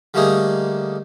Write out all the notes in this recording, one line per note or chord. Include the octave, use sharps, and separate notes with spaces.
D3 G3 A3 A#3 D#4 G#4